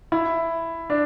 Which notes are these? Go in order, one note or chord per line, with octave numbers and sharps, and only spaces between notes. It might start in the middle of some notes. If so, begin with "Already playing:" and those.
E4
D4